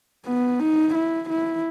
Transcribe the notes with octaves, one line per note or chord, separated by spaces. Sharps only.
B3
D#4
E4
E4